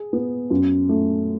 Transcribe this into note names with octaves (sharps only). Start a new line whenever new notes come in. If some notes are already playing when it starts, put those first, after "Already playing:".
Already playing: G#4
B3
F#2
A3